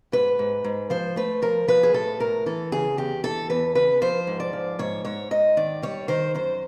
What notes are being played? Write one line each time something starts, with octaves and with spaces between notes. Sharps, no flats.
G#2 B4
G#2
G#2
F3 C5
A3 B4
F3 A#4
F3 B4
G#4
A2 A4
A2 A#4
E3 A4
C#3 G#4
E2 G4
E3 A4
E2 B4
C#3 B4
F3 C5
G#2
D5
F3
G#2 C#5
G#2 C#5
G#2 D#5
D#3 D5
G3 C#5
D#3 C5
F#2 C5